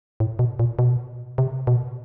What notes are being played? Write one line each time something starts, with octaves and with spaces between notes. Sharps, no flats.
A2
B2
A#2
B2
C3
B2